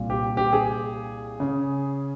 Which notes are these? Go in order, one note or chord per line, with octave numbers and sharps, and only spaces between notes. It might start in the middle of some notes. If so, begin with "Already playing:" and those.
Already playing: C2 A#2
G4
G4
G#4
C#3